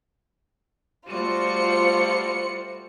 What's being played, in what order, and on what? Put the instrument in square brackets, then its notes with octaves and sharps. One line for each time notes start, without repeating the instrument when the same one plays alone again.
[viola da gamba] G3 A3 F#4 [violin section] F4 C5 C#7